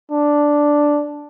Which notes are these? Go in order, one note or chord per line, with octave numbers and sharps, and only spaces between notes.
D4